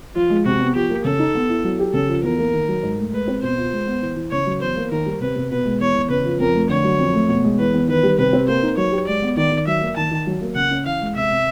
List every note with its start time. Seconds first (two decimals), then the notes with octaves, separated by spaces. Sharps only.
0.15 F3 F4
0.30 G#3
0.45 C3 F#4
0.59 B3
0.75 F3 G4
0.90 A#3
1.05 C#3 A4
1.19 D#4
1.35 B3
1.49 E4
1.64 F#3
1.79 G4
1.94 C#3 A4
2.09 F3
2.23 E2 A#4
2.39 A#3
2.53 D#3
2.68 F#3
2.83 G#2
2.98 A3
3.13 G#3 B4
3.27 C4
3.42 B2 C5
3.57 F4
3.72 G#3
3.86 B3
4.02 E3
4.16 E3
4.31 C#3 C#5
4.46 F#3
4.61 E2 C5
4.76 A#3
4.91 D#3 A#4
5.06 G3
5.21 C3 B4
5.36 C3
5.51 B2 B4
5.65 G#3
5.80 E2 C#5
5.95 E2
6.10 C#3 B4
6.25 F3
6.40 F2 A#4
6.54 A3
6.69 D3 C#5
6.84 F#3
6.99 F2
7.14 A3
7.28 B2
7.44 G#3
7.59 E2 B4
7.74 E2
7.88 D#3 B4
8.03 G3
8.18 C3 B4
8.33 C4
8.48 A#3 C5
8.63 D#4
8.77 F#3 C#5
8.92 G4
9.07 G#3 D5
9.22 B3
9.37 D#3 D5
9.52 D#3
9.67 F#3 E5
9.81 A#3
9.97 D#3 A5
10.11 D#3
10.27 F#3
10.41 A#3
10.55 C#3 F#5
10.71 C#4
10.85 E3 F5
11.01 G#3
11.16 C3 E5
11.30 C3